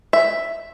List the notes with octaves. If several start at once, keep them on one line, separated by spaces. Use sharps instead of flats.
E5